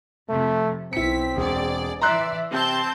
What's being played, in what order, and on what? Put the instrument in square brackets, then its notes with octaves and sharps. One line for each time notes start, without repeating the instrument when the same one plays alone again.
[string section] F2 C3 [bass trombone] A3
[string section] B1 B6 [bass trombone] C4 [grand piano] E4 C#7
[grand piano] E1 [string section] G#4 D5
[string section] E3 D5 E5 [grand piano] A#5 C6 F#6
[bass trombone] C3 [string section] C4 A5 G6